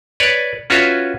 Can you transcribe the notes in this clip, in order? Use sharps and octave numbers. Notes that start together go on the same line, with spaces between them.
B4 C#5 D5
C#4 F4 F#4 B4 C#5 E5